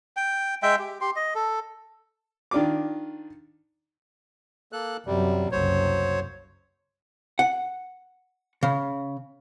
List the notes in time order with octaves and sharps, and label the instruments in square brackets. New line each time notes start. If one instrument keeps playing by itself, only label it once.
[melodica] G5
G#3 E5 G5
G4
G4 C6
D#5
A4
[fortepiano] D#3 D4 F4 D6
[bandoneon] A#3 A4 F#6
[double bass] F#2 F#3 [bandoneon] C3 G3
[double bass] F#1 C2 [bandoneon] F#3 C5 C#5
[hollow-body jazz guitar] F#5
C#3